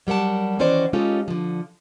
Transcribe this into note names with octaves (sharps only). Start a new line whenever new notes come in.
F#3 G3 A#4 F#5 A5
D#3 E3 C#4 F#4 C5 D5
G#3 C#4 D#4 F4 G4 A4
D3 F3